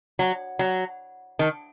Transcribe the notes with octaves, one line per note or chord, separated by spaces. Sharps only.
F#3
F#3
D#3